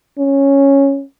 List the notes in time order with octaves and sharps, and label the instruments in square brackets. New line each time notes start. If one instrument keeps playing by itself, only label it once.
[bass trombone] C#4